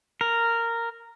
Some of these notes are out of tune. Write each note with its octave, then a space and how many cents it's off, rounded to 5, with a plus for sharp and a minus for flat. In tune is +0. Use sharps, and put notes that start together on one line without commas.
A#4 -10